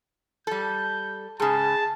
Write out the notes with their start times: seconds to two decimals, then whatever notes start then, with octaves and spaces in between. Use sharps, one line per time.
0.47 G3 A4 G6
1.40 G#2 C#3 G#4 A5